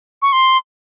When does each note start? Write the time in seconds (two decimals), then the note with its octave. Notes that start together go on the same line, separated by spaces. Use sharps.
0.22 C#6
0.33 C6